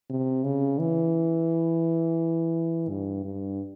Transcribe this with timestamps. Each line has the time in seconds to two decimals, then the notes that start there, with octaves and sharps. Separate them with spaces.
0.10 C3
0.43 C#3
0.78 E3
2.89 G2
3.24 G2